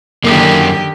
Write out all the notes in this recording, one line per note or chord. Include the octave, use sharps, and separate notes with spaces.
F#2 D3 D#3 A#3 G4